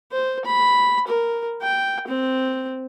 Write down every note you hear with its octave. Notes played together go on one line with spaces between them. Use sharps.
C5
B5
A#4
G5
C4